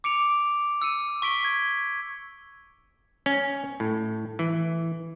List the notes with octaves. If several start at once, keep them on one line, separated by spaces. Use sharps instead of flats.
D6 C#7 D7 F7
E6 C#7 D#7
C#6 B6 D7 G7
G#6
C#4
A2
E3